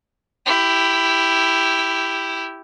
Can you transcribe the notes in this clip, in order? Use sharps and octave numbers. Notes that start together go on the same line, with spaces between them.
E4 G4